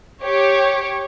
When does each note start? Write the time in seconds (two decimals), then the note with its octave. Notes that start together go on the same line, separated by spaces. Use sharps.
0.24 G4 C#5